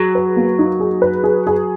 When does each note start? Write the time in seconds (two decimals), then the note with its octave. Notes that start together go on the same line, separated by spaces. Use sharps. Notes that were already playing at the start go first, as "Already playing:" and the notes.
Already playing: F#3 G#4
0.15 B4
0.37 A#3
0.59 D#4
0.80 G#4
1.02 B4
1.24 G#4
1.47 G#4